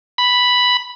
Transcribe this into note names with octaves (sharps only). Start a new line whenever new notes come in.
B5